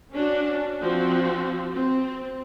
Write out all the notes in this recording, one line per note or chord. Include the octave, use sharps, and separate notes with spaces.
C#4 D4 F#4
F3 C4 F#4
C4